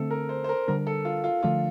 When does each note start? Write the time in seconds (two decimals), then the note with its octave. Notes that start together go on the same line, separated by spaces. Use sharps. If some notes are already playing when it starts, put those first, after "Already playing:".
Already playing: D3 A3 C4 A4
0.11 A#4
0.29 C5
0.44 C5
0.49 A#4
0.68 D3 G3 D4 A#4
0.87 A4
1.05 F4
1.24 F4
1.43 D3 F3 A3 D4 F4